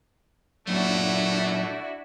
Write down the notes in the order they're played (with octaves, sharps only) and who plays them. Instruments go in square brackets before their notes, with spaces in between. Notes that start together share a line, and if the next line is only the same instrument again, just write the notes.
[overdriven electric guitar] A#2 F#3 [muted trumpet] A3 [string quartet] D4 E4 F#4